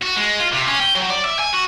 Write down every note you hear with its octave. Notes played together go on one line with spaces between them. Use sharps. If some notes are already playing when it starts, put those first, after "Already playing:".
F#4
G#3
F4
C3
C#4
G5
F#3
D5
E5
G#5
F#4